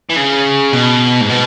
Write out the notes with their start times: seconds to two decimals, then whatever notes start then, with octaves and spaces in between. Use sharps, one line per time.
0.09 E3
0.16 C#3
0.73 B2
1.21 G#2
1.29 B2